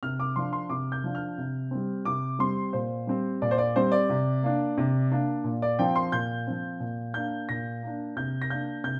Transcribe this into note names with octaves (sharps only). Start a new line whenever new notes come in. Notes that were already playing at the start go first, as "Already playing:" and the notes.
C3 F6
D6
F3 D4 C6
C6
C3 D6
G6
F3 D4
F6
C3
G3 C4
C3 D6
G3 C4 C6
A#2 C5
G3 C4
A#2 D5
C5
D5
G3 C4 C5
D5
C3
A#3 D4
C3
A#3 D4
A#2
D5
F3 C4 G5
C6
A#2 G6
F3 C4
A#2
A#3 D4 G6
A#2 A#6
A#3 D4
C3 G6
A#6
A#3 D4 G6
C3 G6